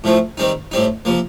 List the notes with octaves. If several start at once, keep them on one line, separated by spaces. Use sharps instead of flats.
A2 F3 A3 C4
D#3 G3 C4 D#4
A2 G3 C4 D#4
C3 F3 A#3